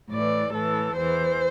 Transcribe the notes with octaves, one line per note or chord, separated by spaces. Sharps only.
A2 D5
E3
A2 E3 A4
E2 E3 C5